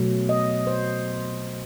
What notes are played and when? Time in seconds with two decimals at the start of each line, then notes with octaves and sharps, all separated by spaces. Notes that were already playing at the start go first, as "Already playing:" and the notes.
Already playing: B2 F#3 A3
0.29 D#5
0.67 C5